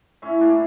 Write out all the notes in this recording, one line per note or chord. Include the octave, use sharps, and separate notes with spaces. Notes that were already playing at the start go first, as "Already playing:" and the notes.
A2 C#4 E4
A2 A#3 D4